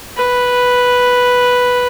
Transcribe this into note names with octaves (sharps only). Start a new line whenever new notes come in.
B4